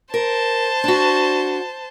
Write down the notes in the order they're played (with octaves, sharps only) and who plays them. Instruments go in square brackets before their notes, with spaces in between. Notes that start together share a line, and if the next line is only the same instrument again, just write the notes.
[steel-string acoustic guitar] A#4 [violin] C5 A5
[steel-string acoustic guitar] D4 F#4